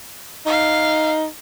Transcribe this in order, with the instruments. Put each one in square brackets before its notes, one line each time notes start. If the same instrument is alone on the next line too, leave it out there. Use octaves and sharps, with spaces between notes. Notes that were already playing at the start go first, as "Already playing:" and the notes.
[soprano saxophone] D#4 [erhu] F5